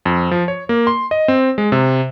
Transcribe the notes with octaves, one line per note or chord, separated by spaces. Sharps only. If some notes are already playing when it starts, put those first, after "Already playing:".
F2
F3
C#5
A#3
C6
D#5
C4
G#3
C3